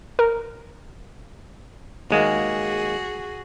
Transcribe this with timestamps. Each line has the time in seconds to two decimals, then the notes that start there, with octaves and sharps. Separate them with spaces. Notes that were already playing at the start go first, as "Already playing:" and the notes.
0.19 A#4
2.10 D#2 G#3 A#3 F#4 G#4